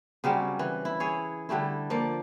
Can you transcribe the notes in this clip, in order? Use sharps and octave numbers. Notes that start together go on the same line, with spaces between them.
C#3 F#3 G3 C4
E3
E4
G#4 C#5
D3 G3 A3 E4
F3 A#3 D5